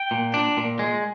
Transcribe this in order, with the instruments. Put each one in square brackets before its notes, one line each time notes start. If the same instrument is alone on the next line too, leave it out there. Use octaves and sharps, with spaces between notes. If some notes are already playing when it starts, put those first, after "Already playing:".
Already playing: [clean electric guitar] G5
A#2
D4
A#2
G#3